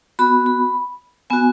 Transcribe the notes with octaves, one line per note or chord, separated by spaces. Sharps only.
B3 F#4 B5
B5
B3 F#4 G#5